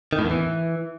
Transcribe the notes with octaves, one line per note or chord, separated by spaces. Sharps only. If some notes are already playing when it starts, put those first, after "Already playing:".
D#3
A2
E2
E3